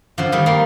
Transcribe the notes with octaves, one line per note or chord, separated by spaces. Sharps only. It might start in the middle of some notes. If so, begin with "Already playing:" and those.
D3 F3
D#3 G3
G3 A#3